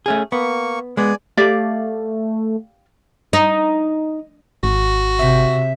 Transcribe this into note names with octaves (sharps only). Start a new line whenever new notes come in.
A3 C#4 G#4
A#3 B3 C#6
G#3 B3 D5 G#5
A3 G4 D5 F5
D#4
G#1 F#4
C3 E5